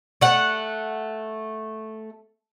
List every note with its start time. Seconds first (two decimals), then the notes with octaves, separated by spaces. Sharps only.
0.21 A3 F#5